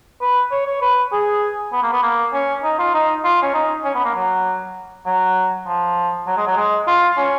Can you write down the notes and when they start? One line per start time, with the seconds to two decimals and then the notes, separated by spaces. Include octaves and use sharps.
0.21 B4
0.51 C#5
0.66 C#5
0.82 B4
1.12 G#4
1.72 B3
1.82 A#3
1.92 B3
2.02 A#3
2.33 C#4
2.63 D#4
2.79 F4
2.94 D#4
3.24 F4
3.42 C#4
3.54 D#4
3.84 C#4
3.94 B3
4.04 A#3
4.15 F#3
5.06 F#3
5.66 F3
6.27 F#3
6.37 G#3
6.47 F#3
6.57 G#3
6.87 F4
7.18 C#4